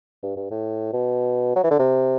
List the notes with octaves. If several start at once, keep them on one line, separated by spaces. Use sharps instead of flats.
G2
G2
A2
B2
F#3
E3
D3
C3